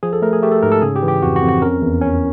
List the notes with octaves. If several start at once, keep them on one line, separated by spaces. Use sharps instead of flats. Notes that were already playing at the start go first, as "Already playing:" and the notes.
F3 G#4
A4
A3 A#4
G#4
A3 G4
A4
G#2 A#4
A4
C#3 G#4
G4
E3
G4
F2 F#4
F#4
F2
F#4
C#4 A#4
E2
C#4